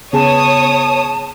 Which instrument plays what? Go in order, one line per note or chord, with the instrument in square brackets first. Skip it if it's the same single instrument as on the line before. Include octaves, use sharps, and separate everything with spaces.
[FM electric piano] C#3 B3 G#4 [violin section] C#5 D#6 [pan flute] A5